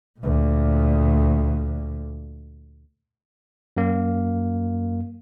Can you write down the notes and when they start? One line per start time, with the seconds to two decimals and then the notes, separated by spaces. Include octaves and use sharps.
0.20 D2 A#2
3.77 F#2 A#3